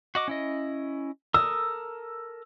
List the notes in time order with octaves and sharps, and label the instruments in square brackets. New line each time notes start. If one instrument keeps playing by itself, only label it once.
[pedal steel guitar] F#4 D#5 D6
C#4 E4 D#5
[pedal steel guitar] A4 A#4 D#6 [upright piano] E6